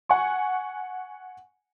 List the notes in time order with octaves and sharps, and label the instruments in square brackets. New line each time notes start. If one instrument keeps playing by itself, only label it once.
[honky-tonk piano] F#5 G#5 C#6